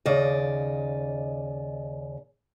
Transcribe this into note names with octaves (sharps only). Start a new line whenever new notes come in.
D#2 C#3 D5 D#5